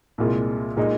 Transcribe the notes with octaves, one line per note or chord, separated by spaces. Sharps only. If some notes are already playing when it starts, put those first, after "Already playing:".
C2 A#2 G#3 F4
A#2 G#3 D#4